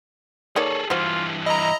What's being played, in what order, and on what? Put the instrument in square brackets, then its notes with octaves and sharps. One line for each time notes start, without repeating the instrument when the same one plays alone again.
[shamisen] D#3 A#3 D5 [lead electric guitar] G#4 A4 [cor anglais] C#5
[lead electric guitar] G2 E3 [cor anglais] F4 [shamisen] F#4 C5
[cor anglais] E4 [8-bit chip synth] D#5 A#5